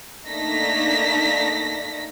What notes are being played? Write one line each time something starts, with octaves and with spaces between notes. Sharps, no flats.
A3 A#3 D4 D#4 A#6 B6